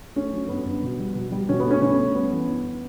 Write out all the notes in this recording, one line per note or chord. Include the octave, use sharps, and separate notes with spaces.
A3 C#4
F#3
G2 B3
G2
B2
G3
B2
G3
B2 C#4
B3
A3
C#4
B2 C#4
A3
G3 B3
E3
G2